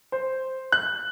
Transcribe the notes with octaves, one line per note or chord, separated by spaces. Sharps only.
C5
F#6